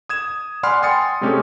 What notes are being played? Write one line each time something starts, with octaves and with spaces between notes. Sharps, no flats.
D#6 G#6 E7
D5 F#5 G#5 B5 C6 F6
G5 G#5 C6 D#6 A6 C#7
C3 G#3 A3 C#4 G4